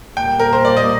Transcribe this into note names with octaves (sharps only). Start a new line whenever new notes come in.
A#2 G3 A#3 G5
A#4
C5
D5
D#5